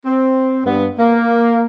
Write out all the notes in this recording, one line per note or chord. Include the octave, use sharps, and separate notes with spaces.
C4
G2 B3
A#3